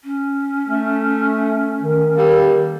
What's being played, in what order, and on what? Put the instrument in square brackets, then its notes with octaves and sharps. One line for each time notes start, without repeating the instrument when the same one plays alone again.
[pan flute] C#4
[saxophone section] A3
[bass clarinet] D#3
[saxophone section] G3 A#3 A4